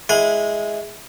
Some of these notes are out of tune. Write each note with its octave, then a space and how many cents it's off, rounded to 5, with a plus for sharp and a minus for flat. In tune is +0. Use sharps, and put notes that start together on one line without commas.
G#3 +0 E4 +0 F#5 -35